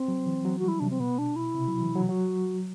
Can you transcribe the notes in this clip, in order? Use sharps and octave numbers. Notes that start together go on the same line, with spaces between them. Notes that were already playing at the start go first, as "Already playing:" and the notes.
Already playing: C4
F#3
E3
F#3
G3 F#4
E4
C3 D4
C4
B2 B3
D4
E4
C3
F#3
E3
F#3
F#3 F#4